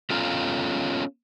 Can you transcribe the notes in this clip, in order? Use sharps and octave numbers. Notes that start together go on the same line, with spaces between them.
B3 C#4 F4 A4 F5 A#5